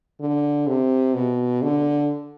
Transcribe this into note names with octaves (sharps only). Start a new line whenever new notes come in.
D3
C3
B2
D3